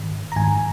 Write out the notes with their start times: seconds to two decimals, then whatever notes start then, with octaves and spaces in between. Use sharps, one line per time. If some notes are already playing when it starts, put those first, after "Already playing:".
Already playing: G#2 D#3
0.32 A#5
0.36 G#2 D#3 G#5